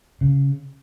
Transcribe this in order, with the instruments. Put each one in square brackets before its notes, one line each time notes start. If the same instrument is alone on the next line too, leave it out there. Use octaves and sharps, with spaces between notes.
[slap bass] C#3